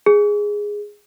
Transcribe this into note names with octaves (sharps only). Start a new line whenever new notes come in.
G#4